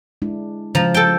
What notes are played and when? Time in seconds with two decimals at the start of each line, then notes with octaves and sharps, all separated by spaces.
0.22 G#3 D4 E4
0.75 C#3 F3 G#3 A#5
0.94 A4 G5